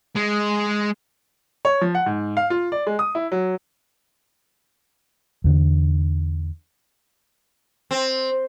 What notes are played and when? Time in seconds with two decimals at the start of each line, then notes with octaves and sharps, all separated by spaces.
0.16 G#3
1.65 C#5
1.81 F3
1.95 F#5
2.06 G#2
2.37 F5
2.50 F4
2.72 D5
2.87 G#3
2.99 D#6
3.15 E4
3.32 F#3
5.44 E2 D3
7.91 C4